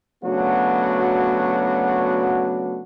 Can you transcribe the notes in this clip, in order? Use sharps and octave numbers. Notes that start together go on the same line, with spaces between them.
C#3 F#3 A3 B3 D4 F#4